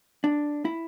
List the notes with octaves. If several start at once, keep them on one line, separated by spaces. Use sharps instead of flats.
D4
E4